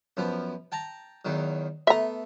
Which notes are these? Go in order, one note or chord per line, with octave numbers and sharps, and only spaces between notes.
F#2 F3 B3
G5 A5 A#5
E2 D#3 F#3
A3 B3 E5 A#5 C6